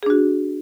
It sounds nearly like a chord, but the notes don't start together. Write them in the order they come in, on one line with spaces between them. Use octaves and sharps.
G#4 D4 F#4